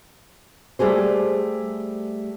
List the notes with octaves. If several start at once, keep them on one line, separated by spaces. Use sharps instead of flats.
G3 A3 G4 G#4 C5